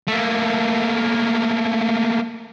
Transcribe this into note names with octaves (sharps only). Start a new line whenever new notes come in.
A3 A#3